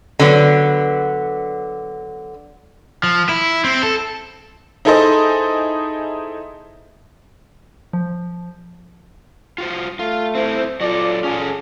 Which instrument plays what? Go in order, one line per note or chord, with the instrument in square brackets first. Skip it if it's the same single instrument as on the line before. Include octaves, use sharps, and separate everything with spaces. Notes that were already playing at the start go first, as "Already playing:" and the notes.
[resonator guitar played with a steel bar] D3 F#3 B3
[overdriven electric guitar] F3
E4
C4
A4
[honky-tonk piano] D#4 E4 G#4 A4 C5 D#5
[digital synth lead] F3
[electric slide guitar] F4 F#4 C5
[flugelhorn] A3 [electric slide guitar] F4
[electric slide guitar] C4 E4 [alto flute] C5
[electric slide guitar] F#3 A4 [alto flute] F4 [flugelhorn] D5
[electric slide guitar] C#4 A4 [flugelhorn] G#4